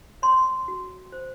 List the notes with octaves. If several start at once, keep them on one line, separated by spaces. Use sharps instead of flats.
C#5 C6
F#4
C5